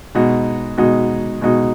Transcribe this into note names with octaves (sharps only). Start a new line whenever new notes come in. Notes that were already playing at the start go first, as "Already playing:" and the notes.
B2 G#3 D#4 F#4
B2 G#3 D#4 F#4
B2 G#3 D#4 F#4